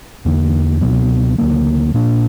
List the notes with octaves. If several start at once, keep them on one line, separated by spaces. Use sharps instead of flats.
E2 D3 A#3
C#2 B2 F#3 B3
D2 C#3 F#3 A#3
A#2 A#3 D4